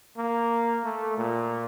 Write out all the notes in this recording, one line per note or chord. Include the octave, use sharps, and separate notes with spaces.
A#3
A3
A#2